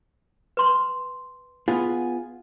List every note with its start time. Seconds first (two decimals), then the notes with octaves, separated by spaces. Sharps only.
0.57 B4 C6
1.68 B3 F4 G#4